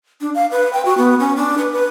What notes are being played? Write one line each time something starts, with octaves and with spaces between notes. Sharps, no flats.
D4
F5
B4
G5
F#4
B3
C#4
D4
B4
B4